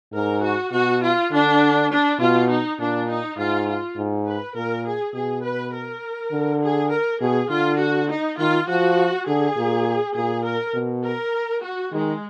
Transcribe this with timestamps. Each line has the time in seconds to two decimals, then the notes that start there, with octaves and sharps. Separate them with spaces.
0.13 G#2 A#4
0.42 F#4
0.72 B2 F#4
1.02 F4
1.31 D3 D4
1.90 D4
2.19 B2 F4
2.49 D#4
2.79 A#2 D4
3.09 D#4
3.37 G#2 F4
3.67 F4
3.97 G#2
4.26 B4
4.55 A#2 A#4
4.85 G#4
5.14 B2 G#4
5.43 B4
5.73 A#4
6.32 D3
6.62 G#4
6.91 A#4
7.21 B2 G#4
7.50 D3 F4
7.79 F#4
8.09 D#4
8.38 D#3 F4
8.68 F3 F#4
9.27 D3 G#4
9.57 A#2
10.15 A#2 G#4
10.44 A#4
10.74 B2
11.04 A#4
11.62 F#4
11.92 D#3 G#3